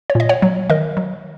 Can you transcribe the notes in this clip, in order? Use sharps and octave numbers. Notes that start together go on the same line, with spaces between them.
C#5
A#2 D#5
C#5 F#5
F#3
D#3 A#4 D#5
F#3